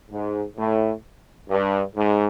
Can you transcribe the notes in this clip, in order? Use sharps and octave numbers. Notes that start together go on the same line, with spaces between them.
G#2
A2
G2
G#2